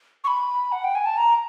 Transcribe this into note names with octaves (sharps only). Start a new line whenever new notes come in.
C#6
B5
F#5
G5
G#5
A5
A#5